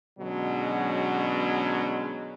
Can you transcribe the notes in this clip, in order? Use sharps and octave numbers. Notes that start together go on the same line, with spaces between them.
B2 D3 F#3 G#3 C#4